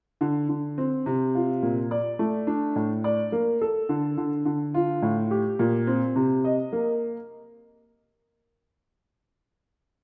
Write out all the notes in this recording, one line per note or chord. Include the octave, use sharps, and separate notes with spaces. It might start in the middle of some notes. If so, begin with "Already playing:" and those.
D3
D3
C4
C3
F4
A#2
D5
A3
D4
A2
D5
A#3
A4
D3
D3
D3
F4
A2
G4
A#2
C4
C3
D#5
A#3